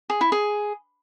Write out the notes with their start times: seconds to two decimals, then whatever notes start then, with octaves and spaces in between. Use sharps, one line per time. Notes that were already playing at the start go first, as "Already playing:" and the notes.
0.10 G#4
0.21 E4
0.32 G#4